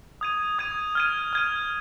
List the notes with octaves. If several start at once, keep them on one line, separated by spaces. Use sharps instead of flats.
D#6 G#6 D#7
D#6 G#6 D#7
F6 G#6 D#7
F6 G#6 D#7